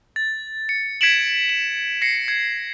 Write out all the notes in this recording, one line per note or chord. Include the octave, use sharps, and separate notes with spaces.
A6
C#7
G#6 B6 C#7 D7 E7 F#7
E7
A#6 C7 C#7
G#6